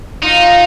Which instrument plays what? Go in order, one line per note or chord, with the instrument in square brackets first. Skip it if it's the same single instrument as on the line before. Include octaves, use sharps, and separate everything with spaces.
[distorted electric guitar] D#4 [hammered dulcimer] F4